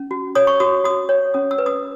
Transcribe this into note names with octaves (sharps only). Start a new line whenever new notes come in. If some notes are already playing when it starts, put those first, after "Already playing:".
Already playing: C#4
F#4
C#5 D#6
C#6
F#4 D#6
F#4 D#6
C#5
C#4 D#6
E6
B4
D#6